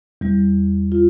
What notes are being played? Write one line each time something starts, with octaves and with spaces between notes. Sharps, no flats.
E2 G3
F4